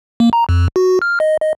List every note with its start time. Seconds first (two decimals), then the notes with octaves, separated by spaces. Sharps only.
0.20 A#3
0.33 A#5
0.49 F2
0.76 F#4
1.02 F6
1.20 D#5
1.41 D#5